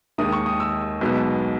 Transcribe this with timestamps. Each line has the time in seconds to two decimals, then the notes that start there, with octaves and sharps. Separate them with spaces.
0.18 D#2 D#3 G#3 D#6
0.33 C#6
0.46 D#6
0.60 E6
1.01 B1 B2 G#3 B3